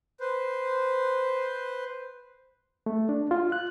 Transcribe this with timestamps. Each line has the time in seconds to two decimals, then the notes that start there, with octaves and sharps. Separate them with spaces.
0.20 B4 C5
2.86 A3
3.09 D4
3.31 F4
3.52 F#6